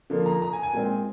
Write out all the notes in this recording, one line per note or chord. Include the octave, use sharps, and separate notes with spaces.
D3 F3 A#3
A#5
A#5
G#5
G#5
A#2 G#3 C4